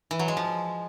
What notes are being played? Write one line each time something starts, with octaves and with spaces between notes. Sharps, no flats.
E3
F#3
G#3
F3